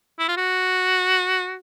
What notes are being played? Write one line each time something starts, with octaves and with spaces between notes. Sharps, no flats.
E4
F4
F#4